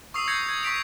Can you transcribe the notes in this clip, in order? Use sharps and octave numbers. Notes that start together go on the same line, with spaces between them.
C#6 D#6 E6 C7 F7
D#6 G6 G#6 A#6 C7 C#7
G#6
C#6 B6 D7 F7